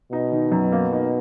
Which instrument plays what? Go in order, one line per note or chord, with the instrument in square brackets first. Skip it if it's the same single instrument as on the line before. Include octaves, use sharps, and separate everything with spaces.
[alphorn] B2 [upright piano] D#4
[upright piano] D#3
F#2
A#3
D#4